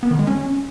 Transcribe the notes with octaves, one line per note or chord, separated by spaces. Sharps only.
B3
D#3
G#3
C#4